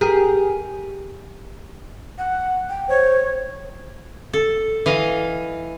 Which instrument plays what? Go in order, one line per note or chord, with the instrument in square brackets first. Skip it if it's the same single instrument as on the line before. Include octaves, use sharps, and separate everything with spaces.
[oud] G4 G#4 A#4
[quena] F#5
G5
[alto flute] C5 [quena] C#5
[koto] A4
E3 D#5 F5